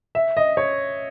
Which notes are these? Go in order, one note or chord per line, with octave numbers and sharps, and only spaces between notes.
E5
D#5
C#5